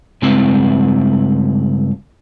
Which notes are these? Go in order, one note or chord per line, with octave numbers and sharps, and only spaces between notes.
G2 C#3 G#3 C4 E4